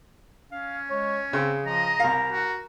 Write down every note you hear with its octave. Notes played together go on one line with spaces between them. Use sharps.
C#4 F5
G#3 C#5
C#3 C4 G#4
F3 D#5 A#5
C2 A#4 F5
F#4